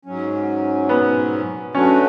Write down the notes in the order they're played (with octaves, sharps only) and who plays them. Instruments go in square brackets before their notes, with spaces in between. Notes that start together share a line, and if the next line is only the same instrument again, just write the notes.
[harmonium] G#2 F#3 C#4
[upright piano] B3
[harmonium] F#3 A3 D4 F#4 B4 [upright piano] C#4